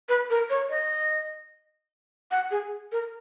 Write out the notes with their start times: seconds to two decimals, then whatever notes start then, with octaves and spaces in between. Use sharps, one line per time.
0.09 B4
0.30 A#4
0.50 C#5
0.70 D#5
2.31 F#5
2.51 G#4
2.92 A#4